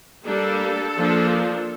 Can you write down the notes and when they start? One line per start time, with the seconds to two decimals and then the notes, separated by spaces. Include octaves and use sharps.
0.25 G3 A#3 D4 A4
0.96 F3 A#3 D4